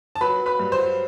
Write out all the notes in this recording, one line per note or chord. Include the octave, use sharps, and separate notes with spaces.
A5
F#3 B4 B5
F#3
B4 B5
G2
C5 C6
F#3